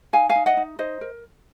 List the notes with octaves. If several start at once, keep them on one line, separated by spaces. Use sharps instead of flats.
D#4 F5 G#5
F5 G#5
D#4
D#5 F#5
D#4
D#4 C5 D#5
A#4